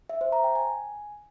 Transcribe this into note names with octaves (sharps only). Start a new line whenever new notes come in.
E5
C5
A#5
G5
G#5